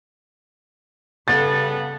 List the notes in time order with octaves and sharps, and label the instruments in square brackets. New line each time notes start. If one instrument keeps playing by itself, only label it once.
[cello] C#3 A4 [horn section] G3 B3 [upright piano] A6